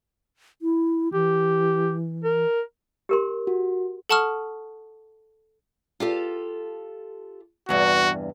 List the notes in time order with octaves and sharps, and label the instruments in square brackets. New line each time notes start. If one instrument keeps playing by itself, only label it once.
[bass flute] E4
[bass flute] E3 [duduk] G4
[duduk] A#4
[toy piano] G4 A#4 C6
[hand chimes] F#4
[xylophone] A4 F#5 A5 C#6 D#6 F6
[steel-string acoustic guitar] F4 G4 A4
[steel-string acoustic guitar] E2 G2 C3 [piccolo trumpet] F#4